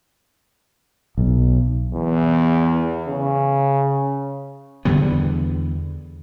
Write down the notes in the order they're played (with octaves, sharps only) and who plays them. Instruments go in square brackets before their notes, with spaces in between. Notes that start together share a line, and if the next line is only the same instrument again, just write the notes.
[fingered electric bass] B1
[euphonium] E2
C#3
[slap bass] E2 D3 G3 B3